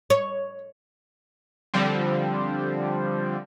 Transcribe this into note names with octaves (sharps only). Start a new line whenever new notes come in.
C#5
D3 F3 G3 C4